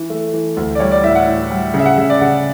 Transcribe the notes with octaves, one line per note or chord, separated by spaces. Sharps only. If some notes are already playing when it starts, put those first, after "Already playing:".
Already playing: E3
A3
E3
D2
D5
G3 C#5
D5
A2 E5
F#5
A2
G3
C#3
E5
F#5
C#3 E5
D5
C#3 F#5